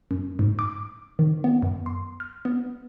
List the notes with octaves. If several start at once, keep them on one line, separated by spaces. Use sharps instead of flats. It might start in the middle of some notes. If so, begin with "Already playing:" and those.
F#2
G#2
D6
D#3
B3
F#2
C6
F6
B3